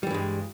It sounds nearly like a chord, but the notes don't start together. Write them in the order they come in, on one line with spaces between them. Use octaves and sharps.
G3 E3 G2 G#3